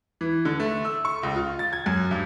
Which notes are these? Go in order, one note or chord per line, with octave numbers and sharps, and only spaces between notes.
E3
D3
A3
E6
C#6
C#2
F4
A6
G#6
F#2
G2